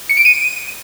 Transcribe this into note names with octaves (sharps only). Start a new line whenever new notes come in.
C#7
D7
D#7